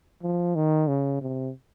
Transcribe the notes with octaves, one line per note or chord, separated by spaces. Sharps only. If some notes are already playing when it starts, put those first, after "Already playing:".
F3
D#3
C#3
C3